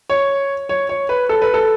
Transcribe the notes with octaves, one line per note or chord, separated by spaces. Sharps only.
C#5
C#5
C#5
B4
A4
B4
A4